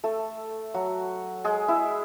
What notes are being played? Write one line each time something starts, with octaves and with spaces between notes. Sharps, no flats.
A3 A4
F#3 F#4
G#3 G#4
E4 E5